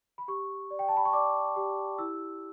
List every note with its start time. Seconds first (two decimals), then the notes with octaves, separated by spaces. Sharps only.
0.18 B5
0.28 G4 C#6
0.71 D5
0.79 G5
0.88 A5
0.97 B5
1.05 C#6
1.13 D5 D6
1.56 G4
1.98 E4 E6